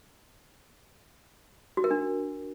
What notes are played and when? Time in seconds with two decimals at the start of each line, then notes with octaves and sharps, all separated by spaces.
1.77 F#4
1.84 A#4
1.91 D4